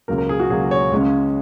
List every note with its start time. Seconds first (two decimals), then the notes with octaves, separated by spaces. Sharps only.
0.08 C#2 C#3 F#3 A#3 A#4
0.18 A#4
0.29 G#4
0.40 F#4
0.50 C#2 C#3 F#3 A#3 G#4
0.71 C#5
0.92 C#2 C#3 G#3 C#4